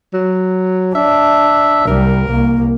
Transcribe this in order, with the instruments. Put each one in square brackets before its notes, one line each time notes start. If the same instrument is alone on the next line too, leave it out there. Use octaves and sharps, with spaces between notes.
[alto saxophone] F#3
[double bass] D4 [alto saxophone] E5
[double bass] C2 G3 [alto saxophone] A#4
[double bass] C2 A#3